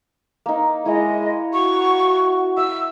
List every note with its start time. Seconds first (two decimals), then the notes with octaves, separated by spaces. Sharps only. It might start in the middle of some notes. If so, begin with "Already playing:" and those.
0.46 A#3 D#4
0.86 G#3 E4 C#5 D#5
1.53 F#4 C#6
2.57 E5 E6